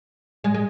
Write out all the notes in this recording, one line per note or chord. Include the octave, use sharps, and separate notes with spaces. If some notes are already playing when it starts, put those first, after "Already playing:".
G#3
G#3